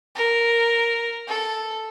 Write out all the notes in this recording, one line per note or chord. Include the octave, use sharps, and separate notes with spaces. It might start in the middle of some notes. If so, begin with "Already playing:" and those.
A#4
A4